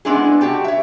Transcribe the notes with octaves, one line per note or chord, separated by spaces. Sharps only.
G#3 B3 C4 D4 E4 G#4
G3 F#4 G4 G5 A5
C#5 E5